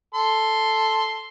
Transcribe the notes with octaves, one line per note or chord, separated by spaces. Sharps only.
A4 C6